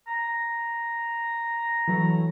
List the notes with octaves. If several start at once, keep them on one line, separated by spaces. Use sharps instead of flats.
A#5
E3 F#3 A3